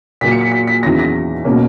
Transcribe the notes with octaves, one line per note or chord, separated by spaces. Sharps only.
A#2 F#3 A#3 B6
C#7
B6
B6
B6
E2 D#3 F#3 C#4 A#6
A#6
B2 A#3 C#4